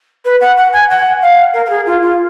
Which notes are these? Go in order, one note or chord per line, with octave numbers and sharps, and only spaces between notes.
B4
F#5
F#5
G#5
F#5
F5
A#4
A#4
G#4
F4
F4